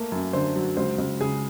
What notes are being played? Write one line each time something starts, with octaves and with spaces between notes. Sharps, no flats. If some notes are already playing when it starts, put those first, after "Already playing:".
Already playing: A3 A#3
F#2
D3 C5
F#3
C#2 C5
C#2
C#3 G#4